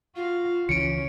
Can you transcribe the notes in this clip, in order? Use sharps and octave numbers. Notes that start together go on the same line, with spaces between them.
F4 F#4 F5
C#2 E3 C#4 C#7 D7